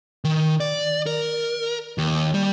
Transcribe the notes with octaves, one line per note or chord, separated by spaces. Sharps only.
D#3
D5
A#4
D#2
G3